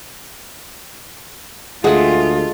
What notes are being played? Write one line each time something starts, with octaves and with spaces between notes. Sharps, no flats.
D2 G#3 A3 F4 G#4 F#5